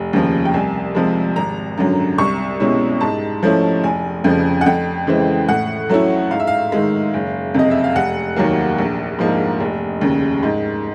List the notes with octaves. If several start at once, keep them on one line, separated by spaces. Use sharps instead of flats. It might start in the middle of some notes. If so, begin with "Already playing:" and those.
Already playing: F1
D#2 C#3 F3
G5
C2 G#5
C3 F3 G#3
G#1 A#5
F#2 D3 F#3
C2 C#6
B2 G#3 C#4 E4
G#2 A5
F3 A3 C#4 E4
F1 G#5
F2 C#3 F3
F#5
F2 G5
C#3 E3 G#3 C4
A2 F#5
F#3 A3 C#4 E4
G#2 F5
E5
F5
D#3 G#3
F#1
F2 C3 D#5
E5
F5
F1 F#5
D#2 D#3 F#3 A#3
A#1
G#2 F3 A#3
F1
D#2 C#3
G#2